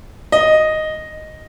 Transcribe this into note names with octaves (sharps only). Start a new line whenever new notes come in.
D#5